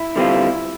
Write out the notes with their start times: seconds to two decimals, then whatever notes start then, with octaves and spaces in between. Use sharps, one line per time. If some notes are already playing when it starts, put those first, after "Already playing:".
Already playing: E4
0.16 D3 G3 C4 F4